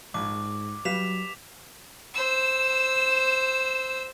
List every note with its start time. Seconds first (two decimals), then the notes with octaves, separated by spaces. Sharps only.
0.14 A#1 G#2 D6
0.85 F#3 G3 B4 F5 B6 E7 F7
2.14 C5 E6